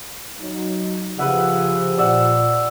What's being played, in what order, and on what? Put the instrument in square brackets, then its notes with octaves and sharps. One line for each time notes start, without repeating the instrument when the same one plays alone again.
[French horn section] F#3 D#4
[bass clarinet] C#3 [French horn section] F3 G4 [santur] B4 E5 F#5
[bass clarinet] A#2 [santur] D5 E5 F#5